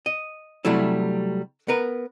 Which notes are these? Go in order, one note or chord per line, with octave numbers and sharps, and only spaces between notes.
D#5
C3 F#3 G3 A3 E4
B3 A#4 B4